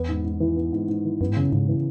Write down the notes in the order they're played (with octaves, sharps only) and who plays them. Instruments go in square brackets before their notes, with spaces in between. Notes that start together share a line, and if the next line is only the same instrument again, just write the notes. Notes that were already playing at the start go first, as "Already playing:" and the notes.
Already playing: [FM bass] E2 [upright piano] B3
[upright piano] G#2
G#2
E3
B3
G#2
G#2
E3
[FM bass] F#2 [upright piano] B3
[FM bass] G#2
[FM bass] F#2 [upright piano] C#3
[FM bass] G#2 [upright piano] C#3
[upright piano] E3